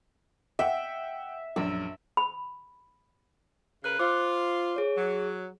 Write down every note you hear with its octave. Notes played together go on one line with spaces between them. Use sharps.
E5 F#5 G5
A#1 F#2 E6
B5
C#3 A#4 B4 F#6
F4 C5 D6
G#4 C#5
F#3